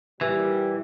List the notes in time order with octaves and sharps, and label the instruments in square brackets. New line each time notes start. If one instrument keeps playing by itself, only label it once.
[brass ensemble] A#2 G3 [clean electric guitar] E3